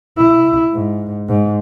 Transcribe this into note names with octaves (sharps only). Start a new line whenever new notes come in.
E4
G#2
G#2